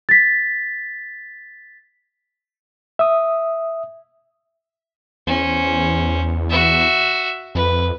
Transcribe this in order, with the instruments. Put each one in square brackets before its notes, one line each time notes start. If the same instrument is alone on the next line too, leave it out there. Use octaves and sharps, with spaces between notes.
[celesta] A6 B6
[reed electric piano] E5 D#6
[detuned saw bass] E2 [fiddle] C#4 C5
[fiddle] F#4 E5
[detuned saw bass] F2 [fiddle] B4